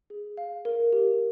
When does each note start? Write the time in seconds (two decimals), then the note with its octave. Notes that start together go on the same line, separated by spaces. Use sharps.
0.10 G#4
0.37 F5
0.65 A#4
0.93 G4